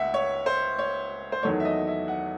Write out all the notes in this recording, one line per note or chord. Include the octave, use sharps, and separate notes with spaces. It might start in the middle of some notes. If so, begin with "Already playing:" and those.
Already playing: C#2 E5 F#5
C#5
C5
C#5
C5
E2 D#3 F#3 A3 C#5
E5
D#5
E5
F#5